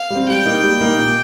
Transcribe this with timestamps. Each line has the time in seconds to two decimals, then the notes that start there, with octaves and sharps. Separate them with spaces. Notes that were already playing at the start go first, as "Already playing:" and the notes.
Already playing: F5
0.10 G3 C4
0.29 G3 G5
0.46 A#3 D#4
0.64 G3
0.81 A#3 D#4
0.99 A#2